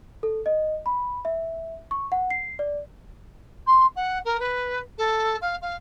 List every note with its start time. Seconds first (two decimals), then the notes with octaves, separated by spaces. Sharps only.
0.23 A4
0.46 D#5
0.86 B5
1.25 E5
1.91 C#6
2.12 F#5
2.30 C7
2.59 D5
3.66 C6
3.95 F#5
4.25 A#4
4.39 B4
4.98 A4
5.41 F5
5.61 F5